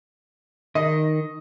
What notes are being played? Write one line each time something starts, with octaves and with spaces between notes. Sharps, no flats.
D#3 D#5